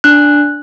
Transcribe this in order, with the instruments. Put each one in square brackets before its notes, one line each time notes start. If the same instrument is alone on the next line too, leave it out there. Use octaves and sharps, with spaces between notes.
[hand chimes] D4 F#6